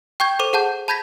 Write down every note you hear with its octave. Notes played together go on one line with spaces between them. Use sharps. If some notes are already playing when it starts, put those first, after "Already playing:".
G5 C#6 G6 G#6
A4 C5 D6 D#7 F7
G#4 F#5 A5 G6
A5 B5 G6 G#6 A#6 B6